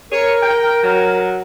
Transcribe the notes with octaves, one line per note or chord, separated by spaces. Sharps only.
G#4 A#4 C#5
G5
F#3